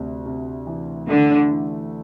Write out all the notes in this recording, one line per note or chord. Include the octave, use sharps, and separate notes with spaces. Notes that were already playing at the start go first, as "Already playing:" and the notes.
Already playing: D2 C3
C3
E3
D3 A3
E3